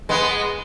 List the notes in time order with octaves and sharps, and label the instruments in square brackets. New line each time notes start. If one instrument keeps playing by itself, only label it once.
[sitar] G#3 B3